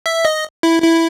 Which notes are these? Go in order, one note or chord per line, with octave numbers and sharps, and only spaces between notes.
E5
D#5
E4
E4